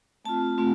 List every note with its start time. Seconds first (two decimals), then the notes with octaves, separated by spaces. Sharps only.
0.25 A3 C4 F4 A5
0.58 A3 C4 F4